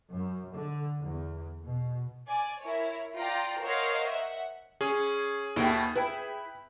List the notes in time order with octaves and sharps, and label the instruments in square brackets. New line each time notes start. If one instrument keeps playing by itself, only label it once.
[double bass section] F#2
D3
E2
B2
[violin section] D5 G#5
E4 A#4 C#5
F4 D5 G5 A#5
A#4 C5 C#5 D#5 F5 F#5
E5 F#5
[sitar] C#4 [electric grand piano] G#4
[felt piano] D#2 G5 [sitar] B2 A3 E4
[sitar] E4 [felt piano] B4 G5 B5